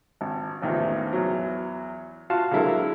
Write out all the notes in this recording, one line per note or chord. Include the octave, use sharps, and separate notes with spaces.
G#1
A1 E2 D#3 F3
E2 F#3
F4 F#4 F5 A5
D3 F#3 G#3 E4 A4 A#4